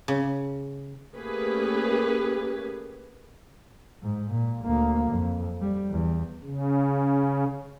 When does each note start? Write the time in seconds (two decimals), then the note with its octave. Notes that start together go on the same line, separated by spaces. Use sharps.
0.08 C#3
1.16 A3 A#3 C#4 G4 G#4 B4
4.02 G#2
4.31 A#2
4.65 D2 A#3
5.11 F2
5.61 G3
5.90 E2
6.43 C#3